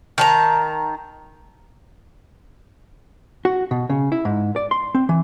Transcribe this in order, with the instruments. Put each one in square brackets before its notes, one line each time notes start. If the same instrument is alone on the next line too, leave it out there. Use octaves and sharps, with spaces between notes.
[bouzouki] D#3 A5 A#5
[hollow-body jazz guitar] F#4
B2
C#3
E4
G#2
D5
C6
C4
E3